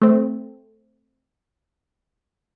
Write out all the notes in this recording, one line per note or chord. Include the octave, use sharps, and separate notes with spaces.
A3 C4